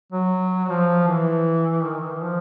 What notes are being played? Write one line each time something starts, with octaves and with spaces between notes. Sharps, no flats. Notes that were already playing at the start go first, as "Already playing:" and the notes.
F#3
F3
E3
D#3
D#3
E3
F3